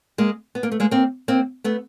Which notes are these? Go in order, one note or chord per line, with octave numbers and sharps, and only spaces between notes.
G#3 A#3
B3
A#3
A3
G#3 A#3
A#3 C4
A#3 C4
A3 B3